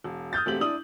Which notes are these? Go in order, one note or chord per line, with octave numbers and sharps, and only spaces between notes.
E1
D#6 F6 G6 A6
E1 A3 C4 G4 F#7
D4 E4 D#6 F#7